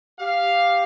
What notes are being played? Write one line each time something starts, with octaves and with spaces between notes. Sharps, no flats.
G4 F5